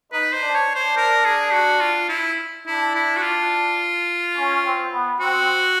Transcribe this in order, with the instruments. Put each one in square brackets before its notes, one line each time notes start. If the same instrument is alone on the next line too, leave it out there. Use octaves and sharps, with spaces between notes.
[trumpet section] D#4 [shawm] B4
[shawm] C5
[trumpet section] D4
[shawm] C#5
[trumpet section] D4
[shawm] C5
A#4
G#4
F#4
F4
E4
[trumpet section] D4 [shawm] E4
[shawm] E4
F#4
F4
[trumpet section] C#4
C4
B3
[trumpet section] C4 [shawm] F#4